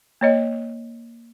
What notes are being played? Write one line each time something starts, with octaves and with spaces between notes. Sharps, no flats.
A#3 C#5 D#5